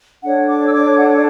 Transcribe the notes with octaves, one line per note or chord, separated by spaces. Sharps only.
D4 A4 C#5 F#5
D6
E6
D6
F#5